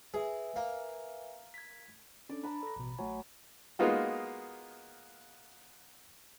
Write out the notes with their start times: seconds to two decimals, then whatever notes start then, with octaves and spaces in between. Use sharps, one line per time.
0.14 G#4 B4 E5 G#5
0.56 A#3
1.54 G#6 B6
2.29 C#4 D4 A4 D5
2.43 D4 B4 A5 A#5
2.63 A4 A#6
2.76 A1 B2
2.98 A1 F#3 A3 G#5
3.79 G#3 A#3 B3 D#4 F4 F#4